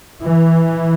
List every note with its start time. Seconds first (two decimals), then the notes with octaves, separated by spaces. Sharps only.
0.23 E3